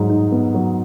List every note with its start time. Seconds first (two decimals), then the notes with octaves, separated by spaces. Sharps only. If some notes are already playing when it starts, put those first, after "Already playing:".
Already playing: G#2 F#3
0.09 D#4
0.32 B3
0.55 F#3